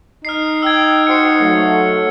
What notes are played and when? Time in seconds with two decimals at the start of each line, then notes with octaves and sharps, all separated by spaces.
0.25 D#4 F6 C7
0.63 G5 E6 G#6
1.07 F#4 C5 C7 C#7
1.42 F#3 A3 F#5